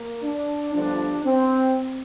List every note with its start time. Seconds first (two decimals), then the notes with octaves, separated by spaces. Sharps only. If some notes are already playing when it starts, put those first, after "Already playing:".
Already playing: A#3
0.23 D4
0.73 G1 G2 D3 F3 D4
1.25 C4